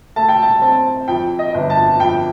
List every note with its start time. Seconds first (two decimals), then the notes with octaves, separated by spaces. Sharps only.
0.16 A3 A5
0.29 G5
0.42 A5
0.62 C4 A5
1.08 F2 G5
1.39 D#5
1.54 G1
1.70 A5
2.00 F2 G5